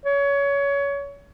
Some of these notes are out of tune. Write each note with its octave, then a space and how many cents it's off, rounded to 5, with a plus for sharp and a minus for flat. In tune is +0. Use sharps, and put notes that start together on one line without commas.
C#5 +25